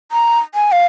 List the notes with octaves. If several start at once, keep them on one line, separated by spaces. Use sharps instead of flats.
A#5
G#5
F5